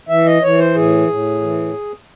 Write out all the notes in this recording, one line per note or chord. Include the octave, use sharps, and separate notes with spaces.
E3 E5
D#5
E3 C#5
C5
A2 G#4
A2
E3